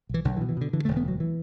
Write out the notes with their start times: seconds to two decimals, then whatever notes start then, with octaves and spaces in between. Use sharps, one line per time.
0.09 B1 E3
0.25 B1 D3
0.37 E3
0.41 B2
0.49 E3
0.57 B2 D3
0.73 D3 E3
0.85 E1 A3
0.97 B3
1.05 D2 F#3
1.20 E3